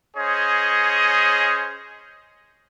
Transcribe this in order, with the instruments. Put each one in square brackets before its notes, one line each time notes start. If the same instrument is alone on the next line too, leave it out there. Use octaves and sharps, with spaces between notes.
[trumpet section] C#4 G#4 C5 C#5 D#5